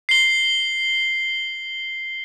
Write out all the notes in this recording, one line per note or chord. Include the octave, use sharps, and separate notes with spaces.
C7 G7